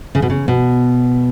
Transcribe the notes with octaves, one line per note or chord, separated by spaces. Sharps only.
C#3
B2
C#3
B2